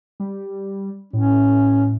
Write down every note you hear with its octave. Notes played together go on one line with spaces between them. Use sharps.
G3
A2 C#4